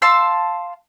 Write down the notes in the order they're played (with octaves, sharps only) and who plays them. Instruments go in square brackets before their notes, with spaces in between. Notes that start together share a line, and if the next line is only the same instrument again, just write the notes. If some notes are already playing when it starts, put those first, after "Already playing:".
[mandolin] F5 A5 C6 E6